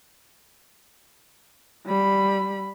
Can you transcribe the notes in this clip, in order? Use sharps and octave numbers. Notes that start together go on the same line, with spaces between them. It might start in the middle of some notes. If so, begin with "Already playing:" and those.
G3 B5